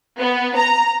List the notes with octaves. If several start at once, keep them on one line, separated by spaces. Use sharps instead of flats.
B3
A#5